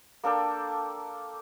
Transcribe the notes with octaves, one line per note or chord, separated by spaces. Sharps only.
A#3 D4 A4 G5